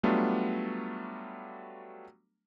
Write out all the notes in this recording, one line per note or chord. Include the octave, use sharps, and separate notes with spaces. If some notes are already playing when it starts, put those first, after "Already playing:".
F#3 G3 A3 B3 D4 F4